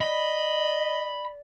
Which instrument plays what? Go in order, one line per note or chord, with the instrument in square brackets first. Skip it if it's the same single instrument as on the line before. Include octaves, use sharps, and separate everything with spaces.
[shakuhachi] D5 [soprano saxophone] D#5 [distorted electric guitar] B5